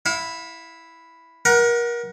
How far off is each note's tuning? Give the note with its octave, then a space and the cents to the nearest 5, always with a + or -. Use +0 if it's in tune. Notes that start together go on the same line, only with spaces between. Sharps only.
E4 +0 F5 +40
A#4 +30 F#5 +0